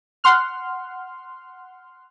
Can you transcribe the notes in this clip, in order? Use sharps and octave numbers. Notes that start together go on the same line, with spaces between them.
F#5 C6 F6